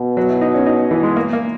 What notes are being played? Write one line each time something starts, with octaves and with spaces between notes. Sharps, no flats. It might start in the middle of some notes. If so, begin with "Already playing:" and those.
Already playing: B2
F#3
E4
D#4
C#4
D#4
E3
G#3
A#3
A#3